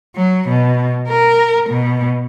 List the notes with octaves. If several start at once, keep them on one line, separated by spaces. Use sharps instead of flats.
F#3
B2
A#4
B2